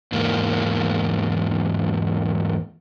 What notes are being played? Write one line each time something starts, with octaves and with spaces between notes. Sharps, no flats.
E2 G#2 A#3